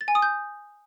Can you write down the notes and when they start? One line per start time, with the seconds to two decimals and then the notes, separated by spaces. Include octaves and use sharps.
0.01 A6
0.08 G#5
0.15 D#6
0.22 G6